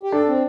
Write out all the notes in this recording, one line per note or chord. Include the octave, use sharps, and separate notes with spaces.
G4
D4 A4
C4